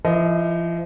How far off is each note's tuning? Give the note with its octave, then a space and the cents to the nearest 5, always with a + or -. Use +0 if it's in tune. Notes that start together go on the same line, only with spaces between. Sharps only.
F3 -35 E4 -15 D#5 +0